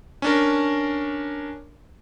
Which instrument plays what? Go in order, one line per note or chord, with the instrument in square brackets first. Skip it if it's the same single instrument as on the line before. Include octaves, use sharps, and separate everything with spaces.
[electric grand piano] C#4 D4 A#4